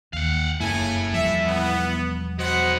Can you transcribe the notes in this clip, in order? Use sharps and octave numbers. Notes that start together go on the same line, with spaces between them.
D#2 F5 F#5
F1 F#2 C#3 A#3 E4 A4 G#5
E1 F3 G3 E5
B3
F#3 B3 C5 D#5 F#5